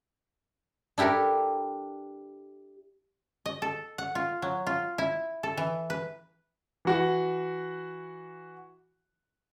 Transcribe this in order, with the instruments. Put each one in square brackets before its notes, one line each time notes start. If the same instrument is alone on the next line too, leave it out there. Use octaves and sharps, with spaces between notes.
[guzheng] D4 E4 G4 A4 A#4
[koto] D#5
A4
F#5
F4
F#3
F4
E4
A4
E3
B4
[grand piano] E3 F#4 F#5